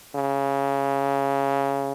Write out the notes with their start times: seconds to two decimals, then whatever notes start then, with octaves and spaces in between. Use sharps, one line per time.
0.16 C#3